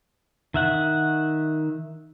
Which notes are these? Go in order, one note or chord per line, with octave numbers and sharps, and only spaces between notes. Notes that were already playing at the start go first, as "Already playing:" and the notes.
D#3 E5 F#5